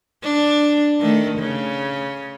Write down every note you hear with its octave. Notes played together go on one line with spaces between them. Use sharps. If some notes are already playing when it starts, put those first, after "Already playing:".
D4
D#3 A3
C#3